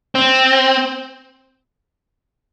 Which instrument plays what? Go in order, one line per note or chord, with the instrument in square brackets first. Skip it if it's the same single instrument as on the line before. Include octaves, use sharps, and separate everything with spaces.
[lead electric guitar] C4